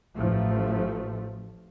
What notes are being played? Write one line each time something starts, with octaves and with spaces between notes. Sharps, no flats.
A1 F3 A3